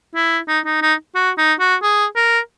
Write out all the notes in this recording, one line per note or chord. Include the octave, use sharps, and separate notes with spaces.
E4
D#4
D#4
D#4
F#4
D#4
F#4
G#4
A#4